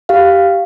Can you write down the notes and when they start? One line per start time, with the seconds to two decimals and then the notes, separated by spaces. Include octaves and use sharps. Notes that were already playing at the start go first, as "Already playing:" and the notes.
0.09 G4 F5